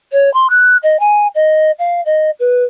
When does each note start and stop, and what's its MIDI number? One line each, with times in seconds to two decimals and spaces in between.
0.13 0.32 73
0.34 0.47 84
0.50 0.77 90
0.83 0.97 75
1.00 1.27 80
1.35 1.71 75
1.79 2.01 77
2.05 2.30 75
2.40 2.63 71